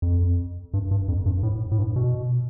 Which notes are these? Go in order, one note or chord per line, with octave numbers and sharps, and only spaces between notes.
F2
G2
G2
F2
G2
A2
A2
G2
B2